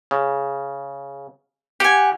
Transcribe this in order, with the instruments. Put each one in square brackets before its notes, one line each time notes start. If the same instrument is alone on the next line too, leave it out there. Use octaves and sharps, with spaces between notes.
[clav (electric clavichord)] C#3
[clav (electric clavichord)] G4 [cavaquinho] F#5 G#5